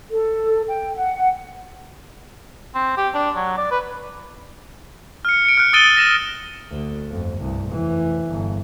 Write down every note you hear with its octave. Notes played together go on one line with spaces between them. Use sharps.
A4
G5
F#5
C4
G4
D4
F#3
D5
B4
F6 C#7
C#7 D7
F6 F#6
D#6 E6 A6 D7 D#7 G7
A#6 D#7 E7
D2
G1 F2
C2 G2
F1 E3
G1